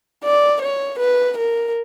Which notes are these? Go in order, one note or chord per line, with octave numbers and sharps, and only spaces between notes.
D5
C#5
B4
A#4